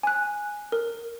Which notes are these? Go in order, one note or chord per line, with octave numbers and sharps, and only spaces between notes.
G#5 F#6
A#4